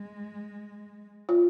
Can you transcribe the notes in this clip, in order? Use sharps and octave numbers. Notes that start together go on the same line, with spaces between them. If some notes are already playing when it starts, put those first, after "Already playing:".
Already playing: G#3
F4